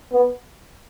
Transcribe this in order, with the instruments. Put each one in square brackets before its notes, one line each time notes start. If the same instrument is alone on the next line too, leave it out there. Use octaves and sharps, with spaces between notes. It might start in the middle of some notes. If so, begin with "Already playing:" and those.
[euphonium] B3